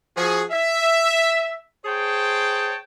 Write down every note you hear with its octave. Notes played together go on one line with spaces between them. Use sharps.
F3 F#4 G#4
E5
G#4 C5 C#5 G5 A5